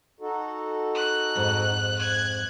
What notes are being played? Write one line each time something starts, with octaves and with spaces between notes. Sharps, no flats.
D#4 F#4 A4
F#6
F2 G#2
F#6 G#6